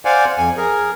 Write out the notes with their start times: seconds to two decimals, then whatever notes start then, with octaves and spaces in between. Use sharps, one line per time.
0.05 C5 D5 F5 F#5 G#5
0.38 F2 G#5
0.57 G#4 A#4